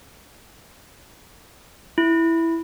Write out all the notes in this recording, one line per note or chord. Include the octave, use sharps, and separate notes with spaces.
E4